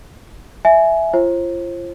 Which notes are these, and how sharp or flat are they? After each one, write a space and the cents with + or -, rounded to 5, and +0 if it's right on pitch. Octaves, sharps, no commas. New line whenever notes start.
E5 +0 G#5 +15
F4 -30 C5 +35